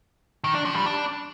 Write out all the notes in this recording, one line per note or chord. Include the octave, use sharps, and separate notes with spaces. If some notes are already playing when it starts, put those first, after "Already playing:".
D#3
D4
F3
G3
D4